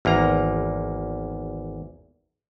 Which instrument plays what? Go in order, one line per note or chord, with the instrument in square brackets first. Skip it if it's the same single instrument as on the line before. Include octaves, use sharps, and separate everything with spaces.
[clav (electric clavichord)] G#1 E2 A#3 A#5